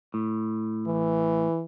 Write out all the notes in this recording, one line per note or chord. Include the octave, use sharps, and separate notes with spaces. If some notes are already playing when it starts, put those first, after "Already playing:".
A2
E3